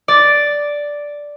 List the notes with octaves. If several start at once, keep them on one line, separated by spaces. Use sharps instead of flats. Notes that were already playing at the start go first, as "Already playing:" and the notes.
D5